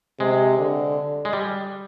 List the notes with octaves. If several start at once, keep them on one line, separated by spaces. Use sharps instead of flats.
C3 G#3
D3
G#3
G3